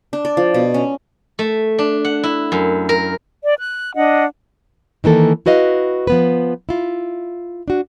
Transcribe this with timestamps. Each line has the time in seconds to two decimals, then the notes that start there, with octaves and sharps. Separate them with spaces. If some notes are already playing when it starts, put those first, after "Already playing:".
0.13 D4
0.25 D5
0.37 F3
0.54 B2
0.74 C#4
1.39 A3
1.79 D4
2.05 F#5
2.23 E4
2.52 F#2
2.89 A#4
3.43 D5
3.57 F#6
3.95 D4 D#5 F#5
5.04 D#3 E3 A#3 A4
5.46 E4 F#4 B4 D#5 F5
6.07 F3 B3 B4
6.69 E4 F4
7.68 D4 F#4